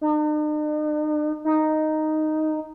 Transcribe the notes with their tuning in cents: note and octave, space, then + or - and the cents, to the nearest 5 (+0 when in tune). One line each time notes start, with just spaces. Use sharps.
D#4 -45
D#4 -5